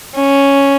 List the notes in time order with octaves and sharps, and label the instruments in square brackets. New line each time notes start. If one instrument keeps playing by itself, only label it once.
[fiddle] C#4